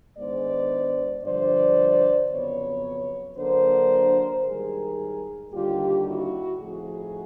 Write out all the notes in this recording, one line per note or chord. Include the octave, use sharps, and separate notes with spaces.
G#2 D#3 G#3 B3 D4 C5 D5
G2 D3 F3 C5 D5
F2 C#3 F#3 B3 B4 C#5
D3 F#3 A#3 D4 A#4 C5
G#2 D#3 G3 G#4 A#4
D#2 D3 G3 F4 G4
E4 F#4
A2 F3 A3 C4 D#4 F#4 G#4